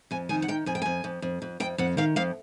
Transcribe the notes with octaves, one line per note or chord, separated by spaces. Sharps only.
F2 G#5
D#3 G#5
F#5
D#3 G5
F2 G#5
G5
F2 G#5
F2
F2
F2
F2 G5
F2 F#5
D#3 F5
F2 F5